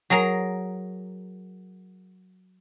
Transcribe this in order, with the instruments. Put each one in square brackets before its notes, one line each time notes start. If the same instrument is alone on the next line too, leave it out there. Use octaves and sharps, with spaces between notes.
[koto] F#3 G#4 A#4 A#5